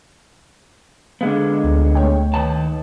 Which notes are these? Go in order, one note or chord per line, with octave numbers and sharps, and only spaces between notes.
D3 G#3 B3 F5
D2
A3 C#5 G5
D#3 B4 A5